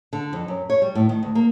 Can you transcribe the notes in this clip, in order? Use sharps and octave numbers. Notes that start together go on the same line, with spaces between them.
D3
F2
F#2
C#5
G3
A2
D#3
D2
A#3